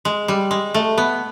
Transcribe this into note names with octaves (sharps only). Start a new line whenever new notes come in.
G#3
G3
G#3
A3
B3